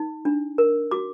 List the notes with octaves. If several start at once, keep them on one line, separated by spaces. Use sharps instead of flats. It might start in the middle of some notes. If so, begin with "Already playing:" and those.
Already playing: D#4
D4
A#4
F#4 D6